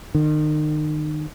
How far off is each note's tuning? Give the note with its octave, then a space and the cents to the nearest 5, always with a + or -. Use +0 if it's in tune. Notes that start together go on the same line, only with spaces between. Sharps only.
D#3 -35